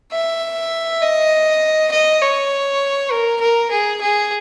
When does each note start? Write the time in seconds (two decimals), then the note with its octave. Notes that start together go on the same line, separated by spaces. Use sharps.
0.12 E5
1.02 D#5
1.92 D#5
2.22 C#5
3.12 A#4
3.41 A#4
3.71 G#4
4.02 G#4